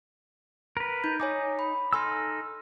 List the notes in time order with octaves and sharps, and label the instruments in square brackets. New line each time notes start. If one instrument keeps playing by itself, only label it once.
[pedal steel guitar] A#4 B4
[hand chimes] D#4 G6
[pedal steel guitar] D#4 [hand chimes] C#5 G#5 D6
[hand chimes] B5
[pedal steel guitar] D#4 A4 E6 [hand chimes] G#5 C6 F6